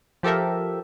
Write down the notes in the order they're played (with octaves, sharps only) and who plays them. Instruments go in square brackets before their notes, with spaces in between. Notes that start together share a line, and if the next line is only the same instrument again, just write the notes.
[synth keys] F3 G4 A4 A#4 E5